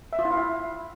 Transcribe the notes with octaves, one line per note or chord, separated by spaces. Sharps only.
E5
F4
E4
F5
E4